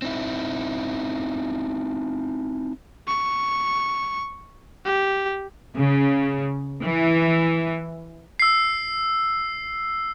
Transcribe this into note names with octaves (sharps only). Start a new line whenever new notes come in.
C4 D#4 E4
C#6
G4
C#3
E3
E6 C7